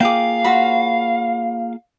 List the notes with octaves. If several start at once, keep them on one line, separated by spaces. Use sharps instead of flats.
A#3 F4 G#4 F5 G5 D6
F#4 C5 B5